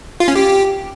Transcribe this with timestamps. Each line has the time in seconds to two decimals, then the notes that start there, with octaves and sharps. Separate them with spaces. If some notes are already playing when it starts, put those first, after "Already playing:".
0.20 F4
0.28 C#4
0.36 G4